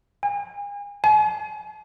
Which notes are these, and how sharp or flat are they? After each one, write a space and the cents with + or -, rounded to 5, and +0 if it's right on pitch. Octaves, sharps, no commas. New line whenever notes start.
G#5 -35
G#5 +45